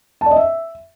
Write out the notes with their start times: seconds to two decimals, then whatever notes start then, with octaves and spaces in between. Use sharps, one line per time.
0.21 A5
0.26 D5
0.31 D#5
0.36 E5